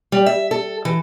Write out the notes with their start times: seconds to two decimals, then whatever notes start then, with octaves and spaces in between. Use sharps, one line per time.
0.12 G3
0.26 E5
0.51 A4
0.85 E3